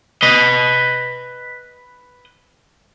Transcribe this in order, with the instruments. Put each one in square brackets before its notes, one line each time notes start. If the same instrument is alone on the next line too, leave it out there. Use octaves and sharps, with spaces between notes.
[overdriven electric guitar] B4 D#5